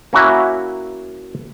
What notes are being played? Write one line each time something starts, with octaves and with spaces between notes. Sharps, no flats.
A#3 C#4 E4 F#4 E5